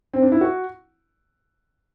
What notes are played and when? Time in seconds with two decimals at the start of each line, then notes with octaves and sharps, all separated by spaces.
0.13 C4
0.22 D4
0.32 E4
0.41 F#4